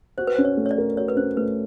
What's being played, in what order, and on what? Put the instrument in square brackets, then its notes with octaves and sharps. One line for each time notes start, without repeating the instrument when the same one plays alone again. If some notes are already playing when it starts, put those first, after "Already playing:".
[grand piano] F#4 [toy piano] C5
[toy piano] B4
[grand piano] C#4 [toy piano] C5
[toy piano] C#5
[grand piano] A3
[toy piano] C#5
D5
[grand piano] A#4
[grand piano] F#4 [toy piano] C#5
[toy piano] B4
[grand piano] C#4 [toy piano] C5
[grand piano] A3 [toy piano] B4